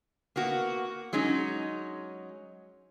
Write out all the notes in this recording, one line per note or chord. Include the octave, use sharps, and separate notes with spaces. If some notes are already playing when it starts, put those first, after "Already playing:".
A#3 B3 F#4
F#3 G#3 C#4 D#4